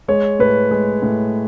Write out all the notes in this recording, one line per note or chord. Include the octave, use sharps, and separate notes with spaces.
G#3 C#5
A2 B4
G#3
A2